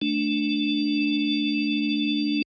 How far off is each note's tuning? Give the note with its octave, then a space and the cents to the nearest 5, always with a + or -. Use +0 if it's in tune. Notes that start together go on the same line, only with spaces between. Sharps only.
A3 +0 D4 +0